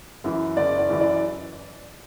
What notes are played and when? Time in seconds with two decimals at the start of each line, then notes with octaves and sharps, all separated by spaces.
0.24 F#2 E3
0.57 F#1 D5
0.79 D5
0.90 F#2 E3
1.01 D5